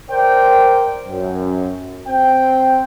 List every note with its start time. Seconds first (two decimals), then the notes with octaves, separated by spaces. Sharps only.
0.11 A#4 C5 D5 G5
1.08 F#2
2.08 C4 G5